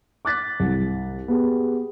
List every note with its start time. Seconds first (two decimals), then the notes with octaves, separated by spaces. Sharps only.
0.25 D6 F#6 A6 B6
0.60 C2
1.28 B3 G4 G#4